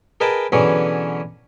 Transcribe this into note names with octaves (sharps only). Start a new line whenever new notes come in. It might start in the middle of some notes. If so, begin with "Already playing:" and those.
G#4 A#4 B4 D#5 G5 A5
B2 D3 E3 F#3 C#4 G#4